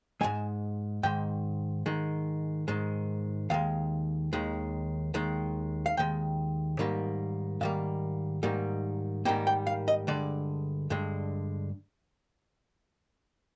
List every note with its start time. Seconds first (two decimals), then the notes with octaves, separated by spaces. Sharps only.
0.21 G#2 D#3 G#3 G#5
1.03 G#2 D#3 G#3 G5
1.86 G#2 D#3 G#3
2.68 G#2 D#3 G#3
3.50 D#2 D#3 G#3 F5
4.33 D#2 D#3 G#3
5.14 D#2 D#3 G#3
5.86 F5
5.97 D#2 D#3 G#3 G5
6.79 G#2 D#3 G3 A#3
7.61 G#2 D#3 G3 A#3 F5
8.43 G#2 D#3 G3 A#3
9.25 G#2 D#3 G3 A#3 G5
9.47 G5
9.67 F5
9.88 D#5
10.07 G2 D3 G#3 D5
10.90 G2 D3 G#3